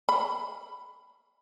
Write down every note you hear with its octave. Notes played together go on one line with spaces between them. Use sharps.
B5